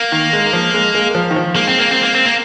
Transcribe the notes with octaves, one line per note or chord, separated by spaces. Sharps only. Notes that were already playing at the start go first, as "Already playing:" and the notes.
Already playing: A#3
D#3
G#3
F3
G#3
G#3
F3
D#3
F3
G#3 A#3
C4
A#3
C4
A#3
C4
A#3